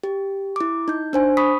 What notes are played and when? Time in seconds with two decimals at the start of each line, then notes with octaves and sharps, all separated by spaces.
0.04 G4
0.56 E4 D6
0.88 D#4 G6
1.13 D4 C5 G#5
1.37 B5 C#6 D#6 B6